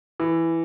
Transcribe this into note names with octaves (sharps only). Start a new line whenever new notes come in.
E3